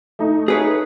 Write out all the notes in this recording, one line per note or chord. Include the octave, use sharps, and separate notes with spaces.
A3 D#4
G#4 B4 C#5